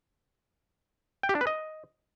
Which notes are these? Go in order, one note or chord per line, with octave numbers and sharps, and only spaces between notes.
G5
G4
D4
B4
D#5